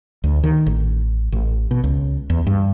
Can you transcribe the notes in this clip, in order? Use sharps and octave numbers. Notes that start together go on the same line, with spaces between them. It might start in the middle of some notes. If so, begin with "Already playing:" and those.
D2
D#3
A1
A1
B2
C#2
E2
G2